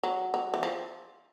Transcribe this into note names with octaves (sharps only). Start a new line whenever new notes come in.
F#3
F#3
E3
F3